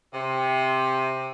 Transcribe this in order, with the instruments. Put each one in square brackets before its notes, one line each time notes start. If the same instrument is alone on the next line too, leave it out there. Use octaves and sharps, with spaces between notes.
[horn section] C3